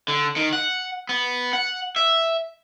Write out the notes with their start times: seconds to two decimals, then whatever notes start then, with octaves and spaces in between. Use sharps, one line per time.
0.08 D3
0.36 D#3
0.53 F#5
1.09 B3
1.53 F#5
1.96 E5